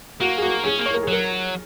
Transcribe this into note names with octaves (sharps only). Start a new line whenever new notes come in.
A#3 F#4
G#4
F#4
C#4 G#4
A#3
C#5
A#4
G#4
F#3 A#4